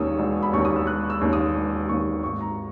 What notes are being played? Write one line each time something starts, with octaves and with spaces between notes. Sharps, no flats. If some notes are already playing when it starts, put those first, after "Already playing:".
Already playing: E1 D#2 D#3 A#3 C#4 D#6 E6
E1
B5
D#2 D#3 A#3 C#4 C#6
D#6
E6
E1 F#6
E6
D#2 D#3 A#3 C#4
D#6
E1
D#2 D#3 A#3 C#4 C#6
G#1 C#6
A#5